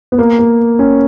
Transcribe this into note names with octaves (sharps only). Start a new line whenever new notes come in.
B3
A#3
A#3
C#4